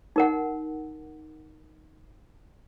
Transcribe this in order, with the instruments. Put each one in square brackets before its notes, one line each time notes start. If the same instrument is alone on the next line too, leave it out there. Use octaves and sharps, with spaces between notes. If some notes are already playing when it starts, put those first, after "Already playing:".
[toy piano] D#4 A#4 F#5